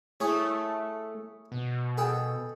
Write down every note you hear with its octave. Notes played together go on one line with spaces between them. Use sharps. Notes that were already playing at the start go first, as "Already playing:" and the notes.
A3 E4 G#4 C#5
B2
G#4 A4 G5